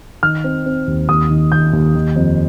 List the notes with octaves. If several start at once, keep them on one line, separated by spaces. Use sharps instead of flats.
D#3 F6
C4
C4
D#2
D#2 D#6
D#3
D#2 G6
D#2
D#3
F2